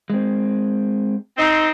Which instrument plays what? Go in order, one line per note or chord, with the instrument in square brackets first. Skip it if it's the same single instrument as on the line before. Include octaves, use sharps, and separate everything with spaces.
[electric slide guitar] G#3 C4
[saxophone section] C4 D#4